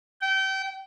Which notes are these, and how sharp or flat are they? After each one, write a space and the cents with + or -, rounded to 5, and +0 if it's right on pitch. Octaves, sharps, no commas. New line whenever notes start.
G5 -30